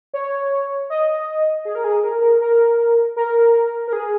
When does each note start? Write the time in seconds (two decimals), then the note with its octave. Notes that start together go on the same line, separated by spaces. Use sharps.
0.14 C#5
0.90 D#5
1.65 G#4
1.75 A#4
1.84 G#4
2.03 A#4
2.21 A#4
2.41 A#4
3.16 A#4
3.88 A#4
3.93 G#4